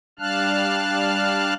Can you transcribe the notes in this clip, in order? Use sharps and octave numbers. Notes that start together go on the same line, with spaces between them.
G3 D4 F5 A5 F6 F#6